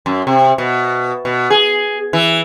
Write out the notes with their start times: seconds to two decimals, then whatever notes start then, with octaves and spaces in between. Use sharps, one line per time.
0.06 F#2
0.27 C3
0.58 B2
1.25 B2
1.50 G#4
2.13 E3